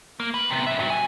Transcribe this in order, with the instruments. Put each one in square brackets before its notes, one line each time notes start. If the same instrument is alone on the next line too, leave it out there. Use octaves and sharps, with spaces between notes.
[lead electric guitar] A#3
B4
C3 B3
C#4 E5
G2 F#3
G#5